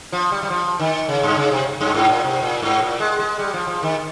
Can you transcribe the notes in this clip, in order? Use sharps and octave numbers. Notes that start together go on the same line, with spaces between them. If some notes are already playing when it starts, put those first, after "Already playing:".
F3
G3
G3
F3
D#3
C#3
G2
C#3
C3
G2
G#2
A#2
C3
A#2
G#2
A#2
G#3
G#3
G3
F3
F3
D#3